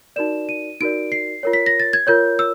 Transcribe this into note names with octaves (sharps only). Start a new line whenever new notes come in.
D#4 F#4 A#4 D5 E7
D#7
D#4 F#4 A#4 D5 D7
C7
F4 A#4 C#5
B6
A#6
A6
G#6
F4 A#4 C#5 G6
E6